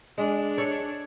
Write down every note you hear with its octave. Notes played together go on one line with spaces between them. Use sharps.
G#3 D4
A4 C#5